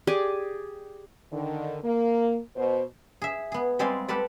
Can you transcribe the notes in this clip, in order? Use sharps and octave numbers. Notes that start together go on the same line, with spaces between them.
G4 G#4 D5 G#5
D3 D#3
A#3
B2 C5
G#4 E5
B3 G#4
G3 G#3 C4 D5 F5 G#5
G4 A4 B4 D5